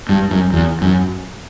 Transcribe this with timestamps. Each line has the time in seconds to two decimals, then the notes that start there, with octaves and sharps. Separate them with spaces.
0.09 G2
0.31 F#2
0.53 E2
0.82 F#2